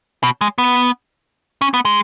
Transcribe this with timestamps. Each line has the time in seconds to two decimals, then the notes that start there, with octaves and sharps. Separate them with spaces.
0.23 B2
0.41 G#3
0.58 B3
1.62 C#4
1.74 B3
1.85 G#3